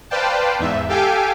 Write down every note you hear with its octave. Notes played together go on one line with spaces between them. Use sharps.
B4 C5 D5 F5 G5 A5
E2 G#2 E5
G4 A4 F5 G5 G#5 D6